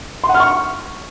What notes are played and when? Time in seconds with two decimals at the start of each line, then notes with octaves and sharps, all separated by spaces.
0.24 C6
0.29 F#5
0.34 F6
0.40 C#6